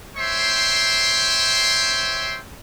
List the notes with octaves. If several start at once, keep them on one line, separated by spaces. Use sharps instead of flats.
C5 C#5 E5 G5 C6